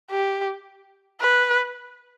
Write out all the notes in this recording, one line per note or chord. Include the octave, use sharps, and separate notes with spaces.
G4
B4